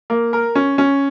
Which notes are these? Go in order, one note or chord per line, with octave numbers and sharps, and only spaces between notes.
A#3
A#4
C#4
C#4